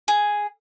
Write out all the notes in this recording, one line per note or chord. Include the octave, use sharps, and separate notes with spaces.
G#4